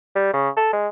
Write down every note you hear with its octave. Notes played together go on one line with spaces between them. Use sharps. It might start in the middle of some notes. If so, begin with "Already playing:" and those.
G3
C#3
A4
G#3